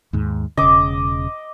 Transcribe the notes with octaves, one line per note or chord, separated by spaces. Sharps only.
D#2 G#2
E1 C#3 D#5 D6